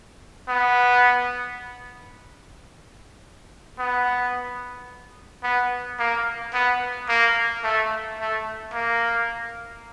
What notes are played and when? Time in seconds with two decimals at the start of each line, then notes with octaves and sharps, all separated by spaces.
0.48 B3
3.79 B3
5.43 B3
5.99 A#3
6.54 B3
7.08 A#3
7.64 A3
8.19 A3
8.74 A#3